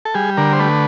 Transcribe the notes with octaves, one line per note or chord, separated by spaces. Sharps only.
A4
G3 G#4
D3 A#4
C5
A3 B4